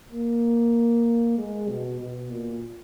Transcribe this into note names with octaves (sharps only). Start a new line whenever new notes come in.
A#3
G#3
B2
B2
A#2